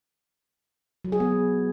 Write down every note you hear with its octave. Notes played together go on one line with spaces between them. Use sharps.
F#3
G#4
B3